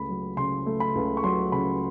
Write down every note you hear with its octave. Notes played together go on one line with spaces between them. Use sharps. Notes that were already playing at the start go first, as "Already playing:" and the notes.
Already playing: C#2 A3 B5
F#3
C#3 C6
A3
B5
C#2
C#6
F#3 C6
C#3 B5